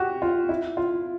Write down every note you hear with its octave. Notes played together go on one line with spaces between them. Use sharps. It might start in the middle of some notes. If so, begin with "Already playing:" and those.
Already playing: F#4 G4
F4
E4
F4